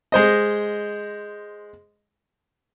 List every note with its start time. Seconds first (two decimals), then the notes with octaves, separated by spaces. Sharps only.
0.12 G#3 C5 D#5